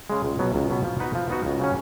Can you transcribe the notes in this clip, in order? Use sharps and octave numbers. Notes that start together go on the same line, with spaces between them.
C#3 G#3
C#2
B2 F#3 B3
C#2
B2 F#3 B3
F3
B3 D#4 F#4 B4
F3
B3 D#4 F#4 B4
C#2
C#3 F#3 C#4